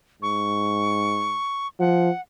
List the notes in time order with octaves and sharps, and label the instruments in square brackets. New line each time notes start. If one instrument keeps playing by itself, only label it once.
[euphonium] G#2 [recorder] C#6
[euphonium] F3 [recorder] F#5